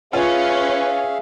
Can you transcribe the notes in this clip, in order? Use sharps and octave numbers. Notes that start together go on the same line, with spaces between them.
C#4 F4 G#4 B4 E5 F5